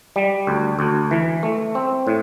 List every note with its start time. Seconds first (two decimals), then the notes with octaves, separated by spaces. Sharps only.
0.16 G3
0.47 D2
0.79 D2
1.11 E3
1.43 A3
1.75 C4
2.07 A2